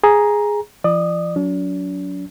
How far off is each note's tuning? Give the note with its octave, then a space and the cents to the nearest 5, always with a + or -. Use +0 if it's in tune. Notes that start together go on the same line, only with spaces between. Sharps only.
G#4 +0 A#5 +10
F3 -40 D5 +35 D#6 +0
F#3 -10 D4 -45